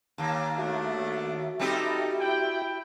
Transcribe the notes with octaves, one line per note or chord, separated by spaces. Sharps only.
D#2 A#3
A3 D4 F#4 E5
G3 C4 D#4 G4 A4
E4 G5